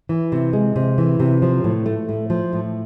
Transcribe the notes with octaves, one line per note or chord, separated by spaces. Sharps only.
E3
C3
G#3
C3
E3
C3
F3
A2
A3
A2
F3
A2